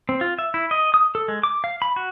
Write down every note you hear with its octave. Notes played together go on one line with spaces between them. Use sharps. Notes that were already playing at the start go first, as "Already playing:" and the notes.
C4
F4
E5
E4
D#5
D#6
A4
G#3
D6
F5
B5
F#4